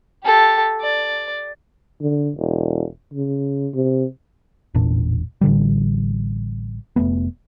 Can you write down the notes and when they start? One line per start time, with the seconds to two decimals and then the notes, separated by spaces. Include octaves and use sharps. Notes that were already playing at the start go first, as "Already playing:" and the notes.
0.25 G4 A4
0.81 D5
2.01 D3
2.36 E1
3.13 C#3
3.75 C3
4.75 E1 A1 A#2 D4
5.41 A1 D3 G3
6.96 F1 G#2 A3 B3